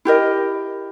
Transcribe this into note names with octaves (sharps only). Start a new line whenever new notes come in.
E4 G4 A#4 D#5